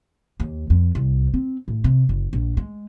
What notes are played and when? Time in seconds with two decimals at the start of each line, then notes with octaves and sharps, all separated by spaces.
0.40 D#2
0.70 F2
0.95 C2
1.34 C4
1.68 A2
1.84 C3
2.09 F#1
2.33 A#1
2.57 G#3